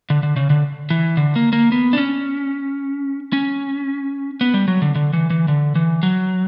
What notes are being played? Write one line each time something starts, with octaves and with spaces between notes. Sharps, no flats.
D3
D3
C#3
D3
E3
D3
A#3
A#3
B3
D4
C#4
C#4
B3
G3
F#3
D3
D3
E3
E3
D3
E3
F#3